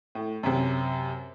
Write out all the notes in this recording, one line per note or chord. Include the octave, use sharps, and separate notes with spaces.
A2
F#2 C3